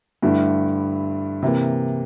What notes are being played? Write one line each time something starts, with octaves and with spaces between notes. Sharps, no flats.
G2 D3 A3 E4
C3 E3 A#3